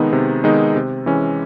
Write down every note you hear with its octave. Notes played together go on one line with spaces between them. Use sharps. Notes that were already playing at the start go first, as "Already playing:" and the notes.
Already playing: C3 D#3 G#3 B3 D#4
C3
D#3 G#3 B3 D#4
C3
E3 G#3 C#4